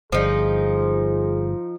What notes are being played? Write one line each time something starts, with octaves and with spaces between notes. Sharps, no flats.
G1 F3 D#4 G#4